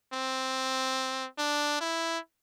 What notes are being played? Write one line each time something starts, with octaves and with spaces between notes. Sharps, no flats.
C4
D4
E4